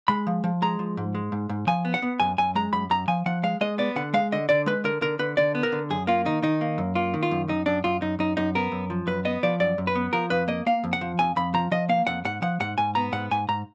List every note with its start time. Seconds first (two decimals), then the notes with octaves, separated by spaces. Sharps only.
0.08 G#3 B5
0.27 F3
0.44 F3
0.62 G#3 A#5
0.79 F3
0.97 G#2
1.15 G#3
1.32 G#2
1.49 G#2
1.67 F3 G#5
1.85 B3
1.94 F#5
2.02 B3
2.20 F#2 G#5
2.38 F#2 G#5
2.55 G#3 A#5
2.73 F#2 B5
2.90 F#2 A#5
3.08 F3 G#5
3.26 F3 F#5
3.43 G#3 F5
3.61 G#3 D#5
3.78 B3 D5
3.96 D3 F#5
4.14 G#3 F5
4.32 D3 D#5
4.49 D3 D5
4.66 G#3 B4
4.84 D3 A#4
5.01 D3 A#4
5.19 D3 B4
5.37 D3 D5
5.55 B3
5.63 A#4
5.72 D3
5.90 F#2 G#4
6.07 A#3 F4
6.25 D#3 D#4
6.43 D#3 D#4
6.61 A#3
6.78 F#2
6.95 A#3 F4
7.14 D#3
7.23 F4
7.31 F#2
7.48 F#2 D#4
7.66 F#2 D4
7.84 F#2 F4
8.02 F#2 D#4
8.19 F#2 D#4
8.37 F#2 D#4
8.55 B3 A#4
8.72 F#2
8.90 F3
9.07 F#2 B4
9.25 B3 D#5
9.43 F3 D5
9.60 F#2 D5
9.78 F#2
9.87 B4
9.95 B3
10.13 F3 A#4
10.30 F2 B4
10.48 A#3 D#5
10.66 A#3 F5
10.84 F2
10.93 F#5
11.01 F3
11.19 F2 G#5
11.36 F2 B5
11.54 F3 A#5
11.71 F3 D#5
11.89 A#3 F5
12.07 F2 F#5
12.25 G#2 F#5
12.42 F3 F#5
12.60 G#2 F#5
12.78 G#2 G#5
12.95 B3 A#5
13.12 G#2 F#5
13.31 G#2 G#5
13.49 G#2 A#5